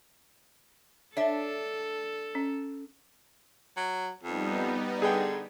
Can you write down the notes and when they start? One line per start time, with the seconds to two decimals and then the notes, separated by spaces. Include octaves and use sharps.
1.17 D4 A4 C#5 E5 A5
2.35 C#4
3.77 F#3
4.23 F2 G3 B3 D#4
5.02 D3 G#4 G5